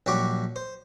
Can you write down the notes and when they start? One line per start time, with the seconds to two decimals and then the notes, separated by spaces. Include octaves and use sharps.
0.06 A#1 F#3 G3 F#5 C#6 D6
0.56 C5